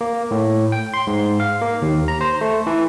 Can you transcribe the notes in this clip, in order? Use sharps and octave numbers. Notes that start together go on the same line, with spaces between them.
A#3
A2
G5
C6
G#2
F5
A#3
D#2
A#5
C5
A3
E3